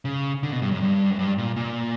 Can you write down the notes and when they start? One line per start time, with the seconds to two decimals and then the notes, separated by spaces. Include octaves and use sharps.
0.05 C#3
0.43 D3
0.52 B2
0.62 G2
0.71 F#2
0.81 G2
1.10 F#2
1.19 G2
1.38 A#2
1.56 A#2